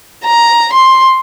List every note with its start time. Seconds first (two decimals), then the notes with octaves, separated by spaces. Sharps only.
0.25 A#5
0.73 C6